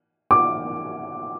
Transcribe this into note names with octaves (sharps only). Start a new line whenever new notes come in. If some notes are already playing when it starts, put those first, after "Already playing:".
D6